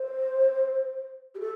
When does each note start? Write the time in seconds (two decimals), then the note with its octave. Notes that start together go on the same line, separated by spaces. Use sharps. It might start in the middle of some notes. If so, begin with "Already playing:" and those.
Already playing: C5
1.35 G4
1.40 A4